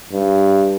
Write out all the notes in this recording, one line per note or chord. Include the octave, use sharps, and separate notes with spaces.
G2